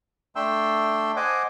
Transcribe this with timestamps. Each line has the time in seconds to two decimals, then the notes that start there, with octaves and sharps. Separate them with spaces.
0.36 A3 D4 E5 G5 C6 E6
1.16 C5 D#5 F#5 G#5 D6